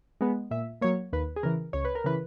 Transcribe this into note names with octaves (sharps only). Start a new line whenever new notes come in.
G#3 B3
A#2 E5
F#3 A#3 C#5
D#2 B4
G#4
C#3 E3 A#4
C#2 C#5
B4
A#4
C#3 E3 B4